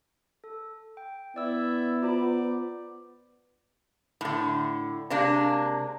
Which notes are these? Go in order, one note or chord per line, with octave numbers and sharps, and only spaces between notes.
A4
G5
B3 E4 D5 E6
F4 C5 D5 A#5 B5
A2 D3
C3 G#3 A#3 D4